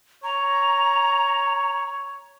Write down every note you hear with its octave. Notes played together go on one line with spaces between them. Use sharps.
C#5 A#5